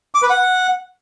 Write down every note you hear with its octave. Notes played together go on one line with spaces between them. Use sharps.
D6
B4
F#5